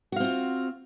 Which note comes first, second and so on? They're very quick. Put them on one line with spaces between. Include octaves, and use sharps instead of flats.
F#4 F5 C4 F4